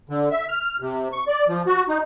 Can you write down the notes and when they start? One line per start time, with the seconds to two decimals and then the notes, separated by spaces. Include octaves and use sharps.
0.10 D3
0.31 E5
0.48 F6
0.80 C3
1.12 C#6
1.28 D5
1.48 F3
1.67 F#4
1.89 D#4